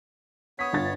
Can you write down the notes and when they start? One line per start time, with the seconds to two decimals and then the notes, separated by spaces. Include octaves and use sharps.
0.59 B3 C#5 D#6 B6
0.73 G1 F4 A6